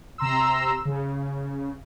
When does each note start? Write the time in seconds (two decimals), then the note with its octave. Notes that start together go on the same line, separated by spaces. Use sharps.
0.18 C3 A#5 C6 E6
0.85 C#3